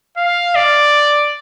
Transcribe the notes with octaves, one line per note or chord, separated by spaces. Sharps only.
F5
D5